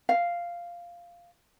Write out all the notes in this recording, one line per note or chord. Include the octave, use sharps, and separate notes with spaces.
F5